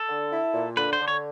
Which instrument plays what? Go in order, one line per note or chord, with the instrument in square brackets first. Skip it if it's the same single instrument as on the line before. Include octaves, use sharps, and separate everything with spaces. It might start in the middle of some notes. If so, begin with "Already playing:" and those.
Already playing: [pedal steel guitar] A4
[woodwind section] D3
E4
A#2
[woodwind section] D3 [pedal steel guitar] B4
[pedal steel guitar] C5
[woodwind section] D3
[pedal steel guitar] C#5